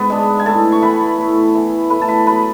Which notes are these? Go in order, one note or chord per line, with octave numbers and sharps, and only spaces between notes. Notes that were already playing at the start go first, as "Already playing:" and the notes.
Already playing: G#2 B3 B4
G#3 D4
G#5
A2 A4 A5
C#6
E3 B3 B4 B5
A2
E3 B3
A2 B4 B5
A5
B4 B5
F#3 B3 B4 B5